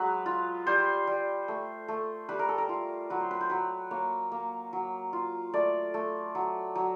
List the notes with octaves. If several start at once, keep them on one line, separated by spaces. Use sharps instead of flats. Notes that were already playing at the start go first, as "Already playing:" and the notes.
Already playing: F#3 G#3 B4
F4
G3 C5
G3
A3
A3
G3 B4
A#4
A4
A#4
F4
F#3 B4
C5
B4
C5
F#3 B4
A#3 C#5
A#3
F#3
F4
A3 D5
A3
F#3
F#3